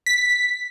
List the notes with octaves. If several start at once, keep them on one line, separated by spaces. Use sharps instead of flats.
B6